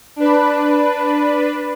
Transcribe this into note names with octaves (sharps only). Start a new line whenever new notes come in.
D4 B4